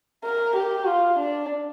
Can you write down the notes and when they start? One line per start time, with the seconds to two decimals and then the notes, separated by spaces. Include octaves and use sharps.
0.24 A#4
0.56 G4
0.87 F4
1.20 D4